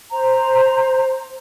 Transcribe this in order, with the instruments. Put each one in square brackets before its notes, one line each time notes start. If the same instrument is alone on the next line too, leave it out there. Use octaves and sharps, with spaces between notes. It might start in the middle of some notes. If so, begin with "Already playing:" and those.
[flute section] C5 A#5